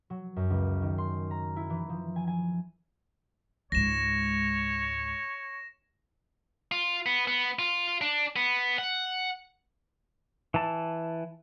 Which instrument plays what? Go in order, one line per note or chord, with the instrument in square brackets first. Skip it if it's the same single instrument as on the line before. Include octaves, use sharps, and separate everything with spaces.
[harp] F#3
F#2
C#2
D#3
C6
A#5
E4
E3
F3
G#5
G#5
[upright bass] C#2 G#2 [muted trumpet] C#5 [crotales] A#6 E7
[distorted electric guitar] F4
B3
B3
F4
D4
B3
F#5
[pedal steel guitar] E3 A5